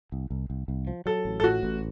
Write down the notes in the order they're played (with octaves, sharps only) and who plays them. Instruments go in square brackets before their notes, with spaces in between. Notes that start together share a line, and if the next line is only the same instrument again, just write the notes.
[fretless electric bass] C2
C2
C2
C2
F3
[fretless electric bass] F#3 [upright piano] A4
[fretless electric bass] A1
[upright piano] A4
[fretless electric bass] A2 [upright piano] F#4
[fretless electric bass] A1